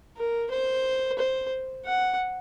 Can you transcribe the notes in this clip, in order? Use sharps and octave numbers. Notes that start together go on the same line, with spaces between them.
A#4
C5
C5
F#5